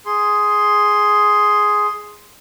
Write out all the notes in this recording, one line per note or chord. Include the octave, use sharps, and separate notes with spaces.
G#4 C6